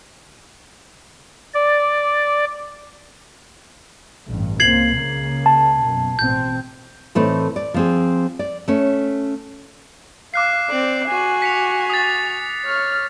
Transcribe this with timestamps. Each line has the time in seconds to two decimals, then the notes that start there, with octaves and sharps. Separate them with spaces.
1.54 D5
4.27 A1 G2
4.60 C#2 A#3 C4 G#6 C7 F#7
4.93 C#2 C#3 A#3
5.46 A5
5.83 F#2 B2
6.19 A1 B2 C4 G6
7.15 A2 E3 A3 C4 D#4
7.56 D5
7.74 F3 C4 G#4
8.39 D5
8.68 A3 C#4
10.34 F5 D6 F#6 C7
10.69 C4 D5
11.08 F#4 G#5
11.42 B6 C#7 F7
11.90 D#6 A6
12.65 C#5 F6